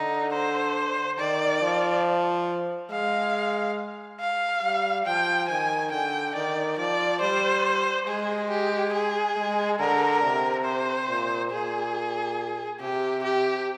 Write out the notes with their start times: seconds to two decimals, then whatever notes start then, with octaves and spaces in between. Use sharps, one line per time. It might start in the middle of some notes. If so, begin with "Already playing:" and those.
Already playing: D3 D#4
0.33 C5
1.18 D#3 D5
1.62 F3
2.91 G#3 F5
4.20 F5
4.63 G3
5.06 F3 G5
5.49 D#3 G#5
5.92 D3 G5
6.35 D#3 D5
6.78 F3 D5
7.21 G3 C5
8.07 G#3 G#4
8.50 G4
8.93 G#4
9.36 G#3
9.79 D3 A#4
10.22 C3
10.65 C5
11.08 A#2
11.51 A#2 G#4
12.80 C3 G4
13.24 G4